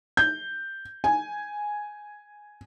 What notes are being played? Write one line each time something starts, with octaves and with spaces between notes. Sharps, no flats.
G6
G#5